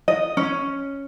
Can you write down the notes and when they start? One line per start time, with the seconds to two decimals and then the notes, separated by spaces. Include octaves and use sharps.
0.08 D#5
0.37 C#4